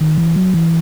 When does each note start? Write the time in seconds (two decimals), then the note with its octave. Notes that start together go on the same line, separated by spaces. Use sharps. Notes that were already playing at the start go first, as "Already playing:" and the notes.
0.01 D#3
0.18 E3
0.36 F#3
0.54 E3